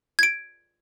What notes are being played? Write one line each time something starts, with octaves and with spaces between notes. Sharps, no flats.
G#6 D7